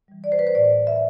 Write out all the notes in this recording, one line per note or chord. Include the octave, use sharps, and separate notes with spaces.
E3 G3
D5
C5
B4
C5
A2 D5
E5